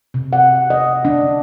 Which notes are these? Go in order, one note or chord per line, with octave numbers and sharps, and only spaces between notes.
C3
F#5
D#5
D4